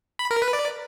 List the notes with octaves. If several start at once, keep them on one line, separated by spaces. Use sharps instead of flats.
B5
A#4
B4
D5